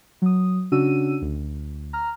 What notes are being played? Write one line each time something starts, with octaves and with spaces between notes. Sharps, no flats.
F#3 D#6
C#3 C#4 D4 F#4 E6 D#7
D2
A#5 F6